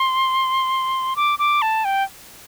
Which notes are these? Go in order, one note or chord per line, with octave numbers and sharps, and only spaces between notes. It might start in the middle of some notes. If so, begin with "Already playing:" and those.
Already playing: C6
D6
D6
A5
G5